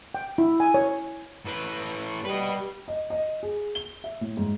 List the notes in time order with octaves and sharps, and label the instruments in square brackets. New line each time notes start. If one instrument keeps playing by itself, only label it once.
[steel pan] G5
E4
G#5
C#5
[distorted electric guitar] A2 B4
[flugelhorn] G3 [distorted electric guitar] B4 D#5
[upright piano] D#5
D#5
G#4
G7
E5
A2
G#2